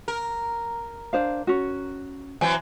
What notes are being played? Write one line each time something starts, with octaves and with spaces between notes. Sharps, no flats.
A#4
D4 C5 F5
C#4 F#4
E3 F#3 C4 G#5